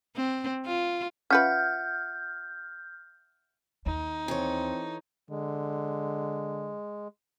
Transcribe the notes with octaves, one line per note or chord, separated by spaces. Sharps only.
C4
F4
C#4 F4 B4 E5 F#5 F6 G6
D#2 D#4
E3 C4 A4 C#5
D3 G#3